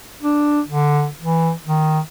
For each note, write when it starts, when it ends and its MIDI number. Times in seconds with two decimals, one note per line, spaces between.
0.23 0.61 62
0.67 1.08 50
1.22 1.52 52
1.67 2.00 51